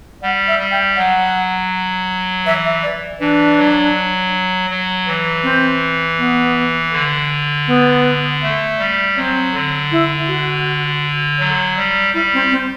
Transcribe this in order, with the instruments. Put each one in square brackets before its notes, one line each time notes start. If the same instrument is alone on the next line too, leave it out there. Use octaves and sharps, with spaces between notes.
[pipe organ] G3 [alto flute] F#5
[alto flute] E5
[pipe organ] G3
[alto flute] G5
[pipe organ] F#3 [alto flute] F#5
[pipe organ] E3 [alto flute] E5
[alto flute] E5
D5
[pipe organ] E3 [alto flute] D4
[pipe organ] F#3
F#3
E3
[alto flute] C4
B3
[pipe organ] D3
[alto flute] B3
[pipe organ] A3
G3
[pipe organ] F#3 [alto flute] C4
[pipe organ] D3
[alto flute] E4
F#4
[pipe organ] F#3
G3
[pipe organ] G3 [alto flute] E4
[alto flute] C4
C4